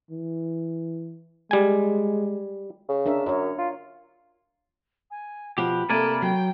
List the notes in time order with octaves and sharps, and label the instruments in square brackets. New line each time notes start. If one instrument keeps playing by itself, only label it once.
[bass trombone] E3
[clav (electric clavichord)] G3 G#5 [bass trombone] G#3
[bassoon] C#3
[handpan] D4 A#4 E5
[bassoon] F#2 [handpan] A#4 C#5
[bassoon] F4
[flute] G#5
[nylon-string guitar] B2 F3 F#5 [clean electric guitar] G4 [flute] B5
[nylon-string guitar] C3 A#3 E5 [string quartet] A4 [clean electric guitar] A#4 D5 G#5
[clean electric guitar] F#3 [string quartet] G5